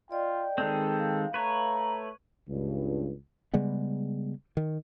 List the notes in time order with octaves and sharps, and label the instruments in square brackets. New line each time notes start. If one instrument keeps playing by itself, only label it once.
[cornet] F4 [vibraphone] D5 D#5 [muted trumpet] G5
[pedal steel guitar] D#3 G#3 C4 [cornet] A4
[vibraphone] F5
[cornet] A3 [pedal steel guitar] B4 C#5 [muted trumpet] A#5
[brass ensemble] C#2 G2
[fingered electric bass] C#3 G3 G#3 B3
D#3